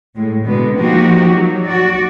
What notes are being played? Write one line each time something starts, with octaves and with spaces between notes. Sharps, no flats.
A2 G#3
B2 D3 G#3 B3
F3 A#3 D#4 F#4 G4
F#3
F#4 D5